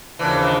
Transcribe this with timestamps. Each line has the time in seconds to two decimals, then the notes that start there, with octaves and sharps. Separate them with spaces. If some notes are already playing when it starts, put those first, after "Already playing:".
0.19 D#2 C#3 E3 F3 A#3 D4
0.43 D#3